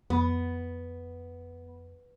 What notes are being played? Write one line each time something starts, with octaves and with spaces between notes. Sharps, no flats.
F2 B3